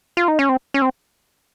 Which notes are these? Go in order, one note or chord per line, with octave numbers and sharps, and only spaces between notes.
F4
D#4
C#4
C4
C#4
C4